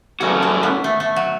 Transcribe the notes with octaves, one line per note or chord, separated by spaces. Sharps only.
F#2 C#3 A3 C#4 F#4
C#4
B3
A3
A3
F#3